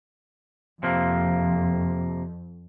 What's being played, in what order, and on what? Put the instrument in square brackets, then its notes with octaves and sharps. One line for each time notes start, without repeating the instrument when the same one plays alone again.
[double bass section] F2 [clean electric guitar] C3 F3 A#3